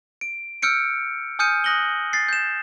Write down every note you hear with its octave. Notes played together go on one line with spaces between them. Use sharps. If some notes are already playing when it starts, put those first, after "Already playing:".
D7
E6 F6 G6 C#7 D7
G#5 D#6 F6 G6 C#7 D#7
D#6 F#6 A#6 F#7 G7
A6 C7
G6 E7